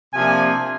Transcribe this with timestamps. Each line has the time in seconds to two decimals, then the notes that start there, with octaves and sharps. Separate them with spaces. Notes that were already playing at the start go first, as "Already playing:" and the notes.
0.13 C3 F3 A#3 D4 G#5